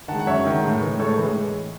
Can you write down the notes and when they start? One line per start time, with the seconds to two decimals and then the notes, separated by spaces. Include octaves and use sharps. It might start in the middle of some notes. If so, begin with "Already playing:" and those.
0.08 D#3 F#5 A5
0.12 G#3
0.20 F#5
0.27 F#2 C#5 E5
0.45 D#3 G#3
0.63 A2
0.81 E3 G#3
0.99 A2 A4 C#5
1.18 E3 G#3